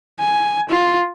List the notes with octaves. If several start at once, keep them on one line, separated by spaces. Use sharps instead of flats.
G#5
F4